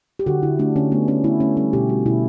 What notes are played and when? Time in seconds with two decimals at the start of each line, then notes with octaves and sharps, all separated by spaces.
0.19 G4
0.26 D3 F#4
0.43 D3 E4
0.59 A3 D4
0.76 D3 C#4
0.91 A3 B3
1.08 A3 C#4
1.24 A3 E4
1.40 A3 C#4
1.57 G3 C#4
1.73 B2 G4
1.89 G3 F#4
2.06 B2 E4